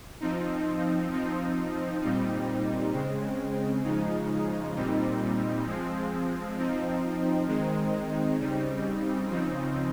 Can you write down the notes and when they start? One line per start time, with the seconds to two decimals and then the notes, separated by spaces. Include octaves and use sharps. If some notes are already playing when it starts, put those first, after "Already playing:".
0.20 F3 C4 D#4
1.11 F3 C4 D#4
2.02 A#2 G3 C4 D#4
2.92 C#3 G#3 C4
3.84 C#3 F3 G#3 D#4
4.75 A#2 G3 C4 D#4
5.66 F3 G#3 C4
6.57 F3 C4 D#4
7.47 D#3 G#3 C4 D#4
8.38 C#3 G3 C4 D#4
9.29 C#3 F3 C4 D#4